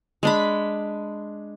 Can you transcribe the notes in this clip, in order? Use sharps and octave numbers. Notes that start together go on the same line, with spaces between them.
G#3 D4 B5